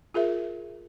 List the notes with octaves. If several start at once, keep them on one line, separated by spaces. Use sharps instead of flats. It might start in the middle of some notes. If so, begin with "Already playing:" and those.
F4 G#4 A#4 E5